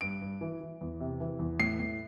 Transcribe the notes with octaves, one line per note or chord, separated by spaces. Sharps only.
G2 D7
G2
E3
E3
E2
C3
E3
E2
A2 C7
A2